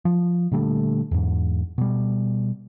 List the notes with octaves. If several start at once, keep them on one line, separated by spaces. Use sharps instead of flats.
F3
A#2 D3 G3 A3
E2 G#2
B2 G3